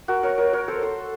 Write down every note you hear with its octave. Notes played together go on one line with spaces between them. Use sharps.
F#4 A#4
A#4 C#5
A#4 C#5
A#4 C#5
A4 C5
A4 C5